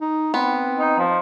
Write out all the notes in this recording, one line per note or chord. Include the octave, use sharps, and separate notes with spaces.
D#4
B3 C4
D#4
F3